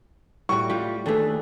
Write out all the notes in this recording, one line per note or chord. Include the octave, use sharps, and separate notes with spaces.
A2 G3 F#4 C#6
G3 F4 G4
D#2 A3 D4 G#4 A4 B4